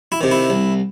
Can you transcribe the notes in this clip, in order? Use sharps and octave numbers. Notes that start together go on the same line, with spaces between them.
E4
C3 D#3
E4
C2